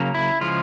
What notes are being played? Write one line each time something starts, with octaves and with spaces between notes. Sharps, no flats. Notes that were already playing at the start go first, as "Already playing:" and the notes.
Already playing: C#3 F#3 A#3
E4
C#3 F3 G#3 F4